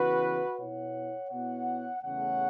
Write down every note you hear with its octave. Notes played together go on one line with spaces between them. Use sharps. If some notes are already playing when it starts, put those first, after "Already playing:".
Already playing: C#3 E3 B3 F#4 B4
B2 B3 E4 C#5 F#5
B2 B3 E4 C#5 F#5
E2 C#3 A3 C#5 F#5